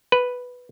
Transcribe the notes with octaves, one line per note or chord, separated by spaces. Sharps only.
B4